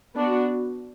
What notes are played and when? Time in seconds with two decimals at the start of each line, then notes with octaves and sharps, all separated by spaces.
0.15 B3 D4 F#4